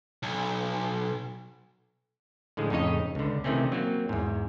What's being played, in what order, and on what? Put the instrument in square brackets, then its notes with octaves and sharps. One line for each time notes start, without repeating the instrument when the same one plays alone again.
[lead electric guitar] B1
[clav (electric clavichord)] A2 D3 F3 G#3
F2 A2 C#3 D#4 C#5 D#5
C#2 D3
C3 D#3 E3 A3 C4 C#4
F#3 A#3 C4
E2 G#2